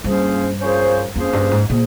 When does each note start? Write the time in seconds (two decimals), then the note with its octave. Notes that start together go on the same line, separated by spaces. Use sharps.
0.04 G2 F3 A#3 C#4 G#4 C5
0.59 F3 A#3 C#4 G#4 C5
1.16 F2 F3 A#3 C#4 G#4 C5
1.33 G2
1.51 G#2
1.70 A#2 G#4 C5